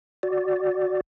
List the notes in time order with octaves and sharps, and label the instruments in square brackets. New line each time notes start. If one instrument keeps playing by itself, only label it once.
[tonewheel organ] F#4 D5